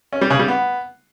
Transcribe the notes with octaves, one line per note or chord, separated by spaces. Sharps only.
C#4
G3
C#3
G3
B3